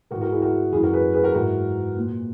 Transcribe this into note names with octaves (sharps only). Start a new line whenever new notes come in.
G#2 E3 F#4 A#4
F#4 A#4
E4 G#4
F#4 A#4
F#2 E3 E4 G#4
F#4 A#4
G#4 B4
G#4 B4
F#4 A#4
G#2 E3 F#4 A#4
A#2